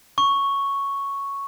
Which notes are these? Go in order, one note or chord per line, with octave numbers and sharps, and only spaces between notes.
C#6